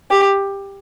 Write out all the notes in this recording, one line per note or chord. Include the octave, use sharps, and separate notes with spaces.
G4